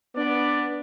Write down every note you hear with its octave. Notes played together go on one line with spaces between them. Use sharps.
B3 D4 D5